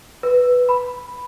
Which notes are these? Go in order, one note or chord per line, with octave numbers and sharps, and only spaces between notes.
B4
B5